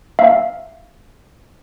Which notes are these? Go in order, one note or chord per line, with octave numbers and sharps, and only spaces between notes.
E5 F5